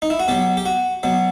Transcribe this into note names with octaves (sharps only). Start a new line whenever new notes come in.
D#4
E4
F#4
B2 F#3 G4
G4
F#4
B2 F#3